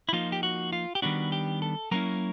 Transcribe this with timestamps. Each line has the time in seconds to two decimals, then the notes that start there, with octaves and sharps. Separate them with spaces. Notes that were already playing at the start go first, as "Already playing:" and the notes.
0.09 E4
0.13 F3 A#3 D#4 F4
0.32 G4
0.43 F#4
0.73 F4
0.95 G4
1.02 D#3 G3 B3 D4 F#4
1.32 G4
1.62 A4
1.91 F#3 A#3 C#4 E4 A#4